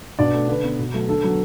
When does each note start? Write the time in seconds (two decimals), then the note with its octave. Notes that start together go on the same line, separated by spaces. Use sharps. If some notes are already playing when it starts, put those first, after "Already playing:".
0.19 B2 D4 D5
0.34 A3
0.48 D3 B4
0.63 B3
0.79 B2
0.94 F#3 A3
1.09 D3 A4
1.23 F#3 B3